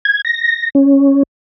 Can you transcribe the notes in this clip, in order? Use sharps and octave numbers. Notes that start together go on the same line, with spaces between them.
G#6
A#6
C#4